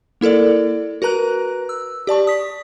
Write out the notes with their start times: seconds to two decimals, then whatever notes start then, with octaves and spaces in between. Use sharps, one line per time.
0.21 A#3 E4 A4 A#4 D5
1.02 F#4 A#4 B4 A#5 F#6
1.69 E6
2.07 G4 D5 A5 C#6
2.27 D#6 B6